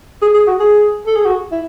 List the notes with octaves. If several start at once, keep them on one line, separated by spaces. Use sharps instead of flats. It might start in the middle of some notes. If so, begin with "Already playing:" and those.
G#4
G#4
F#4
G#4
A4
G#4
F#4
E4